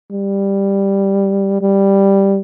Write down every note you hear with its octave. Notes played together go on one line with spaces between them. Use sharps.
G3
G3